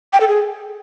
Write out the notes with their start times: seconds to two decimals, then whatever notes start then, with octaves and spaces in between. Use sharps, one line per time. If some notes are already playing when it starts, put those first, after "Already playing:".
0.13 G5
0.20 A4
0.28 G#4